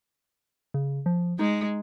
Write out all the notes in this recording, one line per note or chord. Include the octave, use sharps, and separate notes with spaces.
C#3
F3
G#3 D#4